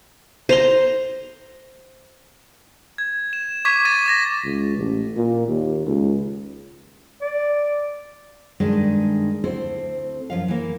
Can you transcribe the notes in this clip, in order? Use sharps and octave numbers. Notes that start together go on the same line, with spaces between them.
C5 A#5 C6
G#6
E7
C#6 D6 G#6 B6 D#7
D6 A6 D#7 E7
D6 A6 A#6
C#2
A1
A#2
D#2
C#2
D5
G2 D#3 G#3 A3 D4
D2 C4 E4 A4 C5
F#2 F3 F5
E3 A#3